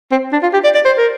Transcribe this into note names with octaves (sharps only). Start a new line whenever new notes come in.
C4
D4
F4
G4
D5
D5
C5
A#4